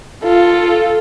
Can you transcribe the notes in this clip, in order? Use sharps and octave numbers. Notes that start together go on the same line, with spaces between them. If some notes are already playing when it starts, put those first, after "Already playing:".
F4 A4